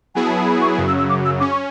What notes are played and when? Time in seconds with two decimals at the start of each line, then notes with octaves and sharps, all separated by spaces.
0.15 F#3 B3 E4 G#4 G#5
0.25 A5
0.36 A5
0.46 B5
0.62 C#6
0.78 F#2 C#3 F#3
0.88 E6
0.99 E6
1.09 D6
1.25 E6
1.40 C#4 D6
1.51 C#6